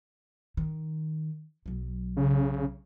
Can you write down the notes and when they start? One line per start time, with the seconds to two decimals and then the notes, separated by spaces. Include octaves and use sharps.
0.57 D#3
1.66 B1 F#3
2.17 C#3